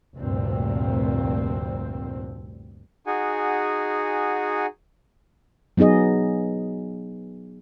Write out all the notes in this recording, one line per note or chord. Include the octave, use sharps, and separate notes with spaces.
F1 D2 G2 A#2 C4
D#4 F#4 G#4 F#5 G#5
F#3 B3 D#4 G#4 D#5